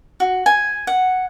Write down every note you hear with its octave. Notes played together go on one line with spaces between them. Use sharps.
F#4
G#5
F#5